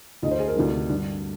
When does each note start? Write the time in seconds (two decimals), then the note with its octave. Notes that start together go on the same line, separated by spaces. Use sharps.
0.22 D2 D#5
0.26 D3
0.31 C5
0.40 G#4
0.48 A#4
0.56 D2 C3 D#3 D4
0.89 G2 D3 D4